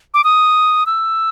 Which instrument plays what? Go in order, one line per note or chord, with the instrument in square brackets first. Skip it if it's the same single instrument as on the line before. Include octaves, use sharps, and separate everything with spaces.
[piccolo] D6
D#6
E6